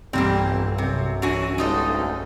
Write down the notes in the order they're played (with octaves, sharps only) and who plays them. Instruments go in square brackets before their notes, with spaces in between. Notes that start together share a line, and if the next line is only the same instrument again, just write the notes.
[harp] B1 G2 G5 [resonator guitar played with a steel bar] E3 A#3 C4 [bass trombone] G3
[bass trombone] G1
[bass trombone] F#2 [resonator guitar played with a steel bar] C3
[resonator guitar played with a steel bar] E3 F#4 G#5 [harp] C#4 D4
[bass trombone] G1 [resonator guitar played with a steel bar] G#3 D#4 A4
[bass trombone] D2 [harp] G6